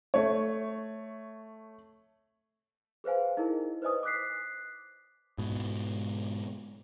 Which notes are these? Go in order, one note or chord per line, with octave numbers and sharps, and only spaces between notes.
A3 C#5
G#4 B4 C5 F5 G#5
D#4 E4 G#4 A#4 D#5
B4 C5 D5 D#5 G#5 D#6
D6 D#6 F#6 B6 C7
G#2 B2